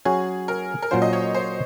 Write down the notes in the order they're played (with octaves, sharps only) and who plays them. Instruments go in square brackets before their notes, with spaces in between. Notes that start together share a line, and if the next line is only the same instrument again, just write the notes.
[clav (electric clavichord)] F#3 C#4 F#4 [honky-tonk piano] G#4
[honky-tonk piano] A#4
A#4
[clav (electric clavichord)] A#2 F#3 C#4 F4 [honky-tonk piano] C5
[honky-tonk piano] D#5
C#5
C5